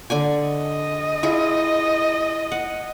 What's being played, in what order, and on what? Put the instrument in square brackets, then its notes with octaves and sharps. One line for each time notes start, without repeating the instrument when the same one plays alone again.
[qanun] D3 D5 G#5
[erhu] D#5
[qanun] E4 F4 G#4
F#5